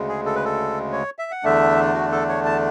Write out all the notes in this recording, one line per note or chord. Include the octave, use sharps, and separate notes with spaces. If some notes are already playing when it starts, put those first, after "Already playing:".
Already playing: D2 C#3 G#3
G#4
A4
B4
A4
C#5
E5
F#5
E2 D3 A3 D4 E5
F#4
A4
C#5
A5